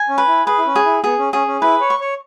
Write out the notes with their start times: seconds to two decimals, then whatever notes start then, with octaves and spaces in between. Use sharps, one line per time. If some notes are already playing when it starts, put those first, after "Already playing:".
Already playing: G#5
0.09 C#4
0.18 B4
0.28 E4
0.46 G#4 B4
0.58 E4
0.66 C#4
0.76 G#4
0.85 E4
1.04 B3 G#4
1.19 C#4
1.33 C#4 G#4
1.47 C#4
1.62 E4 B4
1.81 C#5
1.90 C#6
2.01 C#5